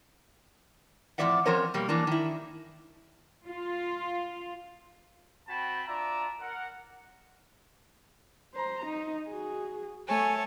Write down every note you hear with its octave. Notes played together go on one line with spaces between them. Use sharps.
F2 A2 C4 D5 E5 F#5
F3 C4 C#4 A#4 C5 C#5
B2 G3 A#3
E3 A#3 D4
D#3 E4
F4
C4 F#4 G5 A5 B5
D4 F4 D5 E5 A5 A#5
A#4 F#5
C5 A#5
D#4
F#4 G#4
A3 A4 C#5 G#5 A5